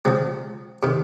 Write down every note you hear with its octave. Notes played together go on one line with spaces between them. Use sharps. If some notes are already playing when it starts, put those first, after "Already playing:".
C#2 C#3 F3 C4
C3 D#3